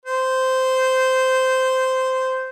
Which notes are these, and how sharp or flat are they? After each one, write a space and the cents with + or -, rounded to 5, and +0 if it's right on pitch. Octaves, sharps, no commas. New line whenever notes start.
C5 -10